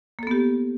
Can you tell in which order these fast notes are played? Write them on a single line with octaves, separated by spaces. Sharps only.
A#3 A4 B3 G4